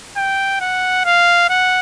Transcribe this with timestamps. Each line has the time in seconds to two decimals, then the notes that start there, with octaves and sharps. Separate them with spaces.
0.16 G5
0.60 F#5
1.05 F5
1.49 F#5